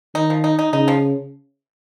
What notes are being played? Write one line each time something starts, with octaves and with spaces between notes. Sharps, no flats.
D#3 D#4
F3
D#4
D#4
C#3 D#4
F3